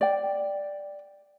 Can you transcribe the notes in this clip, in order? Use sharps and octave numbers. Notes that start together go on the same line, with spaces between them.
D5 G5